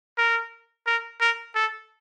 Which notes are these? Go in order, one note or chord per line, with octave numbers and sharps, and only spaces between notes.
A#4
A#4
A#4
A4